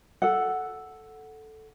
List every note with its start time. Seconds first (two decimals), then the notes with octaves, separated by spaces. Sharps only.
0.22 A4 F#5